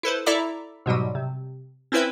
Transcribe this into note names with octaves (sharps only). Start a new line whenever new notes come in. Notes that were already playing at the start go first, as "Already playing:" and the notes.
E4 A4 B4 C5
E4 A4 D5 E5 A#5 D6
G#2 B2 F#3 G3
C3
C4 C#4 E4 B4 C5 E5